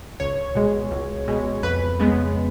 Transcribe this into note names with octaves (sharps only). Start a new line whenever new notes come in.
C#2 C#5
B2 G#3
C#2
B2 G#3
F2 B4
C#3 G#3 B3